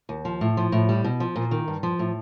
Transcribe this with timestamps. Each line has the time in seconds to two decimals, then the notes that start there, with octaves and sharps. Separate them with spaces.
0.09 D#2
0.25 F3
0.41 A2
0.57 F3
0.72 A2
0.89 G3
1.04 B2
1.20 F3
1.36 A#2
1.51 D#3
1.68 G2
1.83 F3
1.99 A2